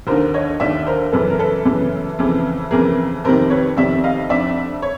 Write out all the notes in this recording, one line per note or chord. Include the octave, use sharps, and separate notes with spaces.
D#2 D3 A#4 C5
C#5 D#5
D#2 D3 D5 E5
A#4 C5
F#2 C#3 E3 A4 B4
A#4
A4 B4
F#2 C#3 E3
F2 C#3 E3
F2 C#3 E3 G#4 A#4
F2 C3 D#3 A#4 C5
B4 C#5
F2 C3 D#3 D5 E5
D#5 F5
F2 D3 D5 E5
C#5